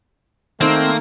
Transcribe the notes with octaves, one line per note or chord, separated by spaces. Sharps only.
D#3 A3 A#3 C4 D#4